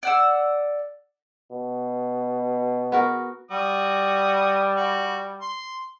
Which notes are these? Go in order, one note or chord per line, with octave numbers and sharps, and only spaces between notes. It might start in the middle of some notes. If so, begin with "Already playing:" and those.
D5 F#5 E6
B2
B3 F#4 A#4
G3 F#4 D#6
F#4
C6